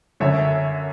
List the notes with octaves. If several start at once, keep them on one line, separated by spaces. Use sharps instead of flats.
F#2 D3 C#5 E5